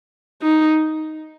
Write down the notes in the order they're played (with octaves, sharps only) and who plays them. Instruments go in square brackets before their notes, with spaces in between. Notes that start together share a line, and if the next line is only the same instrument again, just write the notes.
[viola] D#4